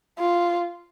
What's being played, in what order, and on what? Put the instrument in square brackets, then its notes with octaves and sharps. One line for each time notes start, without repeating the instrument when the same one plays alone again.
[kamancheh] F4